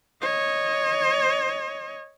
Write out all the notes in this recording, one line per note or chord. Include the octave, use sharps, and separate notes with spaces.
C#5 D#5